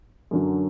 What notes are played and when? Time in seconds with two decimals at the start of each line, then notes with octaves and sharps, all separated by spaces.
0.31 F#2 D3 F#3